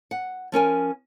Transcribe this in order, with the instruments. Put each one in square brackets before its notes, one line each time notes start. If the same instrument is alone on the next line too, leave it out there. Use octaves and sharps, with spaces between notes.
[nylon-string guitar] F#5
F3 C#4 A#4 G#5